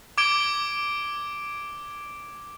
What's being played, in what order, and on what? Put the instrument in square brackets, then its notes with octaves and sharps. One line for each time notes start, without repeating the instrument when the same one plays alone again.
[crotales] D6 G#6 D7 G7